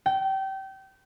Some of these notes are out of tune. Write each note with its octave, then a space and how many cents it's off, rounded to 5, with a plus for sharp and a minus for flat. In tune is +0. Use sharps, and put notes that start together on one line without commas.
G5 -25